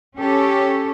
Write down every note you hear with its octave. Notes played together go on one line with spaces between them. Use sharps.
C#4 G4 A4 C#5